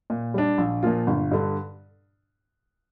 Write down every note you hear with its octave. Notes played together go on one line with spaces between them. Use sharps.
A#2
G3 D4
A#1
A#2 F3 A#3 F4
G1
G2 D3